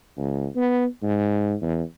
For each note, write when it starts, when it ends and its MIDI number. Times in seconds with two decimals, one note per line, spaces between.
0.18 0.47 37
0.56 0.85 59
1.03 1.55 44
1.62 1.82 40